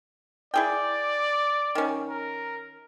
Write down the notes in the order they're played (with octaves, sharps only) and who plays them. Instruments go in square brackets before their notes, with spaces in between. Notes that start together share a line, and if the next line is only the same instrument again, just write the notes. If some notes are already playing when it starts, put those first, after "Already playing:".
[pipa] E4 G#4 G5 [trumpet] D5
[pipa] D#3 C#4
[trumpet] A#4